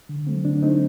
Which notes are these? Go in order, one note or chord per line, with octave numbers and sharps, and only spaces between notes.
D3
F#3 A3 C4
D3 D4
F#3 A3 C4 D#4